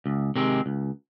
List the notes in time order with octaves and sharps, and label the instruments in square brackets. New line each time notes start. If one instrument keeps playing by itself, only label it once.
[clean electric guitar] C#2
C3 D#3 G#3 C4
C#2